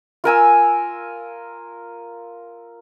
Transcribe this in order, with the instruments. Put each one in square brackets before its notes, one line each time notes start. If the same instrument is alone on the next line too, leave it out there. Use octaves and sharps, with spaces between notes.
[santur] F4 A#4 G#5 E6